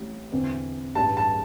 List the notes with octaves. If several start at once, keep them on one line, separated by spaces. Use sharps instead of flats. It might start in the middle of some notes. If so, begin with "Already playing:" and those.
Already playing: A1 A2 G3
E2 D3 C4
A1 G2 E3 G3 D4 A5
A5